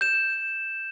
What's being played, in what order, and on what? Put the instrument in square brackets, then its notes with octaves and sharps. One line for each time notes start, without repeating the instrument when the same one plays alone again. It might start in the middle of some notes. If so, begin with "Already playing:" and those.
[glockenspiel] G6 E7